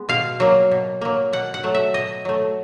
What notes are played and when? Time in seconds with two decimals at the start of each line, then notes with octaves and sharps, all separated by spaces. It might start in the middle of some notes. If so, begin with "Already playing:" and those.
Already playing: G#3 B3
0.09 B2 F5
0.40 F#3 A#3
0.71 B2
1.01 F#3 A#3
1.33 B2 F#5
1.54 F#5
1.63 F#3 A3
1.74 E5
1.94 B2 D#5
2.25 F#3 A3